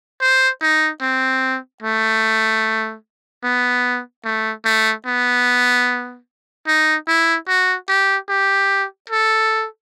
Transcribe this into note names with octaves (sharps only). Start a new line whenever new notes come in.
C5
D#4
C4
A3
B3
A3
A3
B3
D#4
E4
F#4
G4
G4
A4